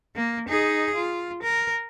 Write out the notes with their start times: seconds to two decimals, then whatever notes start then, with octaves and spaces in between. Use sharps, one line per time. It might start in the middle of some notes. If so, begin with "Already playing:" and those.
0.16 A#3
0.48 D#4 G#4
0.95 F4
1.42 A#4